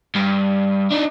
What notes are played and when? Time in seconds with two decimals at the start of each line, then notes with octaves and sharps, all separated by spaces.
0.16 G2
0.92 D4 D#4